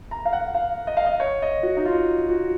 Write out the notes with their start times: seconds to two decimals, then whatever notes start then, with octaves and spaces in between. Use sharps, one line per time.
0.11 A#5
0.25 F5
0.33 F#5
0.54 F5
0.87 D#5
0.97 F5
1.06 D#5
1.20 C#5
1.42 D#5
1.63 F#4
1.77 D#4
1.85 F4
2.29 F#4